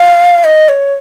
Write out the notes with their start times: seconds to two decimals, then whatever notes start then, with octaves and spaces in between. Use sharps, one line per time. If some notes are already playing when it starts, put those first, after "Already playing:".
Already playing: F5
0.44 D#5
0.69 C#5